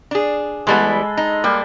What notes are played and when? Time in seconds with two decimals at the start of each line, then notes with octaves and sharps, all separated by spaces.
0.11 D4 G#4
0.67 E3 G3 G#3 B3 A4 B5
1.17 D#4
1.44 G3 A#3